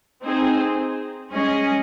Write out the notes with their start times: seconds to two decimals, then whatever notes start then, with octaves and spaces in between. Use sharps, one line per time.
0.23 C4 D#4 G#4 C5
1.32 G#3 C#4 G#4 D#5